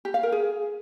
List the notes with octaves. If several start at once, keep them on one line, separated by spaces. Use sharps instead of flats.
G4
F5
A#4
G#4